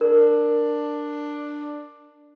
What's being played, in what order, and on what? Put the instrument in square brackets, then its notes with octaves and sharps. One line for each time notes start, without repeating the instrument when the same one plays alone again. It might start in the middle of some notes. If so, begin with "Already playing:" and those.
[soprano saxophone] D4 [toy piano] A#4